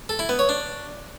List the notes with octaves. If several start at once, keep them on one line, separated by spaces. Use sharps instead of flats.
A4
E4
B3
C#5
D4